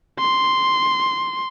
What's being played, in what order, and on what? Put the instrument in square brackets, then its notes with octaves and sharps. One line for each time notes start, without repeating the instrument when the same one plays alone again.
[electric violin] C6